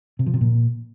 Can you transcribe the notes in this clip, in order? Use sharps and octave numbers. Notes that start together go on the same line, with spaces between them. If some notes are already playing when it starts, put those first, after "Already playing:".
C3
F3
C3
A#2